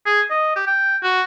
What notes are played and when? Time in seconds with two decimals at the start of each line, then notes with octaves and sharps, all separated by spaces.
0.06 G#4
0.30 D#5
0.56 G4
0.67 G5
1.03 F#4